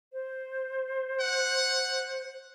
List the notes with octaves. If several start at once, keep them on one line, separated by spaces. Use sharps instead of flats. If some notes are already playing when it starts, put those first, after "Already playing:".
C5
F#5